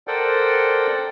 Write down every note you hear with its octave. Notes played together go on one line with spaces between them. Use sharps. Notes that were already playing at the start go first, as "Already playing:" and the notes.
A4 A#4 C5 D5 F#5 G5